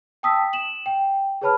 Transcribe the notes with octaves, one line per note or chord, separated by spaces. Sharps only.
G5 A5 D#6 E6 B6
E7 F#7
G5
G#4 B4 C#5 A5 B5 F6